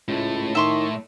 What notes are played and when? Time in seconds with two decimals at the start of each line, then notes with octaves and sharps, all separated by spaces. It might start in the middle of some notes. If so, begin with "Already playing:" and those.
0.08 C#2 A2 A3
0.55 D#3 E5 C6 C#6